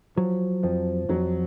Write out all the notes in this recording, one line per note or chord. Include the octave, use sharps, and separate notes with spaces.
F3 F#3
F2 F3
F2 F#3